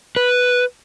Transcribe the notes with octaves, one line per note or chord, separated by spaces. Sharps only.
B4